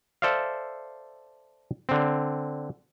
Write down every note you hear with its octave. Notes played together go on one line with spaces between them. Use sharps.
A4 C5 D5 E5 F5
D3 C4